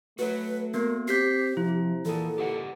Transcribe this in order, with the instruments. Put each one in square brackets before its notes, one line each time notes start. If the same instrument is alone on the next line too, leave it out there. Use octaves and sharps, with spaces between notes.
[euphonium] A3 [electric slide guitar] F#4 C#5 [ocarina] B4
[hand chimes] A#3 B3 [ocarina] A#4
[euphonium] C4 [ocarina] G4 [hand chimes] G6 B6 C7
[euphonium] C3 [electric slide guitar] F3 [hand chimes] E4
[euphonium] A#2 [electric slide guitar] E3 G#4 [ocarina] A4
[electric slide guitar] G4 B4 F#5